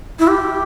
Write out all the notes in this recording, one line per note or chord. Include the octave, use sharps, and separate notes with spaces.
E4
G4